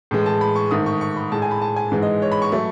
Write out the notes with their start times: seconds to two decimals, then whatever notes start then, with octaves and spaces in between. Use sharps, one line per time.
0.11 A2 E3 G#3
0.26 A5
0.41 B5
0.56 C#6
0.71 G#2 D#3 A3 D#6
0.86 C#6
1.01 C#6
1.16 B5
1.32 A2 G#3 A5
1.42 G#5
1.51 B5
1.62 A5
1.76 G#5
1.92 G#2 E3 G#3
2.02 D#5
2.22 C#5
2.32 B5
2.42 C#6
2.52 F#3 A3